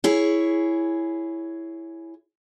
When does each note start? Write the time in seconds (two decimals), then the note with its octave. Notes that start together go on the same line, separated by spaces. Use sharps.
0.04 E4 G#4 C#5